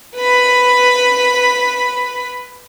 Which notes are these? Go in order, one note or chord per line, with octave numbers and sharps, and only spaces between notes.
B4 B5